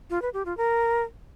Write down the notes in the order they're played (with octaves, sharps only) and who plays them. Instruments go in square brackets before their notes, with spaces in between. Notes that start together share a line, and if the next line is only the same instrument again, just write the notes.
[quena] F4
B4
G4
F4
A#4